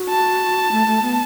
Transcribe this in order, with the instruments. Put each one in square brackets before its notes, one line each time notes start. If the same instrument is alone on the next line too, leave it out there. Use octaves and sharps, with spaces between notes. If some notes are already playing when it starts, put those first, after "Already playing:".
Already playing: [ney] F#4
[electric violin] A5
[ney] A3
A3
B3